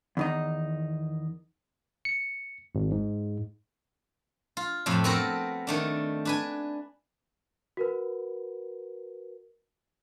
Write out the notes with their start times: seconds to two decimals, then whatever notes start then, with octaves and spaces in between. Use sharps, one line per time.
0.17 E2 D#3 D#4
2.05 C#7
2.75 G#1
2.91 G#2
4.57 F4
4.86 F2 A2 C3
5.04 B3 C4 F#4 A4 A#4
5.67 D#3 A3 D4
6.25 D4 B4 G#5
7.77 F#4 A#4 B4